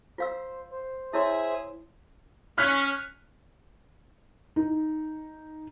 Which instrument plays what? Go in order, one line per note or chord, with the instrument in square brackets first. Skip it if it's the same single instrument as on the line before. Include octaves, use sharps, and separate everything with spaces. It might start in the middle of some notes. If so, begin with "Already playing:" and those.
[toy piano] F4 F5 E6 [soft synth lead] C5
[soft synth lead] C5
[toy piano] E4 C#5 C6 [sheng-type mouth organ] G#4 E5 D#6
[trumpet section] C#4 [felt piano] F6 F#6 B6
[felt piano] D#4